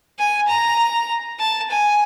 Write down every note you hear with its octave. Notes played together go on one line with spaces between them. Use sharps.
G#5
A#5
A5
G#5